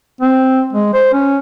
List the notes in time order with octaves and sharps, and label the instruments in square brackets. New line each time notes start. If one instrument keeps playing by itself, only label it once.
[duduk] C4
G#3
C5
C#4